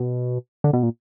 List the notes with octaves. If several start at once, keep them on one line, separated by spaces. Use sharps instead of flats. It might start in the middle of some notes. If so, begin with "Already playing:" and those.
Already playing: B2
D3
B2
A#2